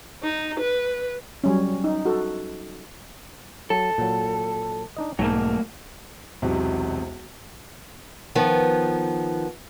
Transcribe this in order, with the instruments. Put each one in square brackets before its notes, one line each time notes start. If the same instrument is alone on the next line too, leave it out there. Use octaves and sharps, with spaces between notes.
[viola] D#4
B4
[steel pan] F#3 G3 C#4
D#4
F#4 A4
[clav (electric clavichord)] F#3 [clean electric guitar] A4
[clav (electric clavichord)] A#2 F#3
D4 D#4 D#5
[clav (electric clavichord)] B1 G#2 G#5 [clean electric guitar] F#3 A3 A#3
[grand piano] E1 B1 E2 C3
[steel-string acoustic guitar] D#3 F3 B3